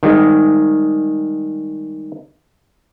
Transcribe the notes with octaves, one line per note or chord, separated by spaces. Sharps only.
D#3 G3 G#3